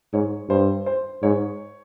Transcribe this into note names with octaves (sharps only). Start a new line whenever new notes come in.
G#2 C#5
G2 C5
C5
G#2 C#5